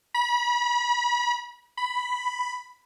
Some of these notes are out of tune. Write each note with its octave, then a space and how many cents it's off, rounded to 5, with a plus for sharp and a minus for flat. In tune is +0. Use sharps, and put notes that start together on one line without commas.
B5 -35
B5 +5